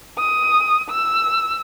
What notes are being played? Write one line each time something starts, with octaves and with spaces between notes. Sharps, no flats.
D#6
E6